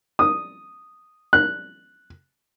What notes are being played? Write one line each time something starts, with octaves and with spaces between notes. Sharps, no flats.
D#6
F#6